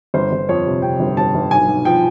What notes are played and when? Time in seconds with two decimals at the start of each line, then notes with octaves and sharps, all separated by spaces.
0.14 G1 C5
0.32 G1
0.49 F2 C#5
0.66 C3
0.82 C3 G5
1.00 G1
1.17 G1 A5
1.35 G1
1.51 B1 G#5
1.68 B1
1.85 F3 G5